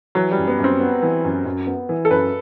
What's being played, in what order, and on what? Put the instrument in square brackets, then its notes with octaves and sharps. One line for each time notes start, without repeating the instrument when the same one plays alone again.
[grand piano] E3 [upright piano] F#3
[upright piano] G3
[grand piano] F#2
[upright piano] B3
[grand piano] F#2 [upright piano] C4
[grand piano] B3
E3
F#2
F#2
B3
E3
[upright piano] A4
[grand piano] F#2 [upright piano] B4